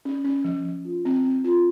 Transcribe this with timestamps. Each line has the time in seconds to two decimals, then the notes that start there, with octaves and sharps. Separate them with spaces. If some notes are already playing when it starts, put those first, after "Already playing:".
0.05 C#4
0.25 C#4
0.44 F3
0.65 F3
0.85 F4
1.05 C4
1.24 C4
1.44 F4